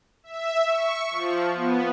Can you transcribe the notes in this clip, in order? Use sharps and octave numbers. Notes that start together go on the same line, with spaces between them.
E5
C#6
F3
B3